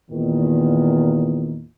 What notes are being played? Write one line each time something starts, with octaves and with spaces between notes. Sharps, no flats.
E2 A#2 D#3